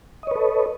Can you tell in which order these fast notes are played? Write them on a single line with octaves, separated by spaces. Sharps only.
D#5 C#5 B4 A4